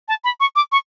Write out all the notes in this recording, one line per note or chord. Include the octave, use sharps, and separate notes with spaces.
A5
B5
C#6
D6
C#6